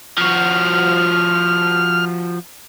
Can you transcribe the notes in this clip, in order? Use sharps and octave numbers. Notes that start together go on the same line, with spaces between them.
F3 F#4 F6